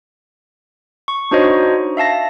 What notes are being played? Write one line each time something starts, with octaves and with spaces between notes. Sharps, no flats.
C#6
D4 D#4 F#4 C5 C#5 D#5
E5 F5 A5 A#6